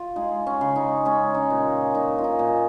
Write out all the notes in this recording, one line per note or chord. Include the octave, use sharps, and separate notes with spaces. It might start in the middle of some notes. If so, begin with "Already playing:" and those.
Already playing: F4
G#3 D#4
C#4
C#3
D#4
G#3 C#4
D#4
A#2
A#2 D#4
F4
D#4
A#2